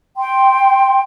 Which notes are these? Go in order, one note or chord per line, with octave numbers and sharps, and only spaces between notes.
G5 C6